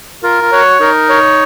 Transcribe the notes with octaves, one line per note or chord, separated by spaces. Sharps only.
F4 A#4
F4
F#4 C#5
D#4 A#4
C#5